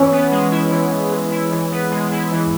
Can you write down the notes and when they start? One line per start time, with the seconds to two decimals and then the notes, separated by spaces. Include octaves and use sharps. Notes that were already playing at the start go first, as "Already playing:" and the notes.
Already playing: E3 C#4 C#5
0.11 B3
0.31 G#3
0.51 E4
0.71 E3
0.91 B3
1.11 G#3
1.31 E4
1.51 E3
1.71 B3
1.91 G#3
2.11 E4
2.32 E3